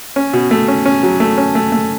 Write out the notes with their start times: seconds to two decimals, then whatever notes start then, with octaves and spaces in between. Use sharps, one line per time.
0.16 C#4
0.33 B2
0.51 A3
0.68 C#4
0.86 C#4
1.03 F#3
1.20 A3
1.38 C#4
1.55 A3
1.72 A3